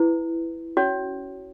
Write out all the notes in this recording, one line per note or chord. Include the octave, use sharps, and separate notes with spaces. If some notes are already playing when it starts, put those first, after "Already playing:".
Already playing: E4 B4
C#4 F#4 C#5